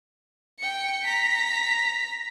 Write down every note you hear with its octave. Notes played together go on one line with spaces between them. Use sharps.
G5 C#7
A#5 B6